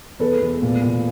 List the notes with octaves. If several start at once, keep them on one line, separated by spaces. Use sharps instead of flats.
E2 A4 B4
E2
A#2
A#2